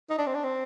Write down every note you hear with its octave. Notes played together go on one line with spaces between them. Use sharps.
D#4
D4
C4
D4
C4